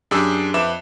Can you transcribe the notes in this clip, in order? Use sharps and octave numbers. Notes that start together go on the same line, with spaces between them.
F#2 D4 G4 G#4 D6 E6
F2 B4 E5 D6 E7